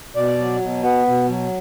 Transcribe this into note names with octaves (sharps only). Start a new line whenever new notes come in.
B2 D5
F#3
B2
B3
B2
F#3